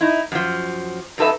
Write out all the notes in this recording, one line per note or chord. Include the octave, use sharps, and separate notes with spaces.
D#4 E4
F#2 F3
F#2 D#4 A4 B4 E5